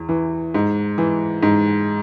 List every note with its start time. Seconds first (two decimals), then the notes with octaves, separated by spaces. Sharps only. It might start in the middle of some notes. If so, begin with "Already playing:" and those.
Already playing: E2
0.09 E3
0.55 G#2
0.98 E3
1.43 G#2